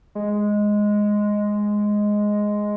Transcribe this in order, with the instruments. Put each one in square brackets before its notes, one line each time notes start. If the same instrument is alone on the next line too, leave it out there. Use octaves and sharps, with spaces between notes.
[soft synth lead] G#3